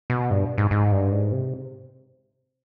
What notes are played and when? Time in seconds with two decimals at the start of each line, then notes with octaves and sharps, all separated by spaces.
0.10 B2
0.31 G2
0.58 G#2
0.71 G#2
0.92 G2
1.12 G#2
1.32 C3